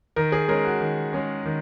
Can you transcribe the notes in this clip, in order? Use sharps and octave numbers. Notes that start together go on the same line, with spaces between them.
D#3 A#4
G#4
G#3 C#4 A#4
F#4
D#3
G#3 C#4
D#3